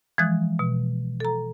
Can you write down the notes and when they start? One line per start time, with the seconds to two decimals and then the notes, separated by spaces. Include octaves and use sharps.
0.18 E3 F3 G#3 D#6 F#6 G#6
0.59 B2
1.20 A4 A#5